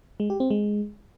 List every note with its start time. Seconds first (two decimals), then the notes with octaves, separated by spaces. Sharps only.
0.20 G#3
0.30 G4
0.40 C4
0.50 G#3